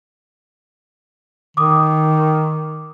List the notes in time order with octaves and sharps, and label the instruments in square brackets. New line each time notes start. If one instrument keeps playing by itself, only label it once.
[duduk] D#3 [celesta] D6 D#6